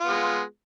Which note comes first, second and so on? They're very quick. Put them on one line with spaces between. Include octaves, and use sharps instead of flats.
F4 B3 G#3